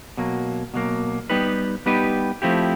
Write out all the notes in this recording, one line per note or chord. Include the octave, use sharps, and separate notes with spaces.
B2 F#3 A#3
B2 F#3 A#3
G3 B3 D#4 G4 B4
G3 B3 D#4 G4 B4
F3 A3 C4 E4 G4